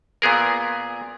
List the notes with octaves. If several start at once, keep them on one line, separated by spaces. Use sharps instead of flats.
A#2 B3 G#4 A#4